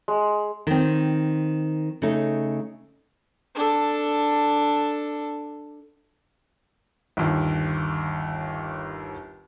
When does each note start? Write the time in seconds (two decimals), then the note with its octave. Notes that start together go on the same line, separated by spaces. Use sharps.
0.08 G#3
0.67 D#3 C4
2.02 C#3 A3 D#4
3.55 D4 A4
7.17 G1 D#2